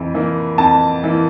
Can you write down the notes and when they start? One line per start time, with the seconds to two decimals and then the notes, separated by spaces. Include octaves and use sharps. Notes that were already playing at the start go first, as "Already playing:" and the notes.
Already playing: F2 E3 E4
0.14 E3 A#3 E4
0.58 F2 A5
1.03 E3 A#3 E4